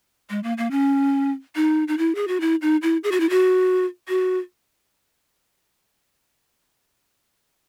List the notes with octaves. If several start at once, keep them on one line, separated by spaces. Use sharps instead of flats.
G#3
A#3
A#3
C#4
D#4
D#4
E4
G#4
F#4
E4
D#4
E4
G#4
F#4
E4
F#4
F#4